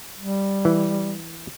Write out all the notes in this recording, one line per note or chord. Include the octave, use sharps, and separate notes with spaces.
G3
E3